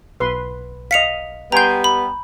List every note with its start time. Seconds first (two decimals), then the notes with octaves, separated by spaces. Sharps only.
0.20 B1 B4 C6
0.91 D#5 F5 B6 C#7 F7
1.52 G3 B3 G5 G#5 A#5 C6 G6
1.84 B5